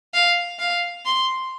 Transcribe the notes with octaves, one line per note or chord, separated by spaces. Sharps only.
F5
F5
C6